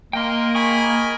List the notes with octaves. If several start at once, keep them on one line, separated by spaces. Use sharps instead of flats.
A#3 A#4 D#5 G5 C6
G#4 G#5 B5 C#6